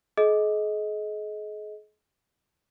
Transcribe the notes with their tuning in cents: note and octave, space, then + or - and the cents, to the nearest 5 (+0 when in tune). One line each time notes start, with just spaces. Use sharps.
G#4 +40 D#5 +20